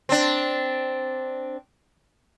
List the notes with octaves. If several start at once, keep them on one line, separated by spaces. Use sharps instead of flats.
C4 D4